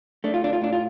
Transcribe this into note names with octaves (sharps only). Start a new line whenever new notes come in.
A3 D4
F4
D4
F4
A2 D4
F4